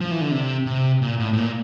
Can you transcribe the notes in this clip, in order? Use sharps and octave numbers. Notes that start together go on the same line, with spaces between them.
F3
E3
D3
C3
C3
A#2
A2
A2
A#2